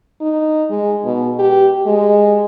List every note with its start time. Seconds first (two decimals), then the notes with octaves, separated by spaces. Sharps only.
0.21 D#4
0.70 G#3
1.04 B2
1.39 G4
1.86 G#3